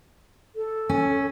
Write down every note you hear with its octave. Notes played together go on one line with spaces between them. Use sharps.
A4
C#4